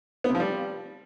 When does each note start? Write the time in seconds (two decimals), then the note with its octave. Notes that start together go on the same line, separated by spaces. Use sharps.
0.24 B3
0.30 C3
0.35 F3
0.40 G3